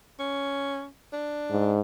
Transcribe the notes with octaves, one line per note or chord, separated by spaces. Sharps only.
C#4
D4
G#2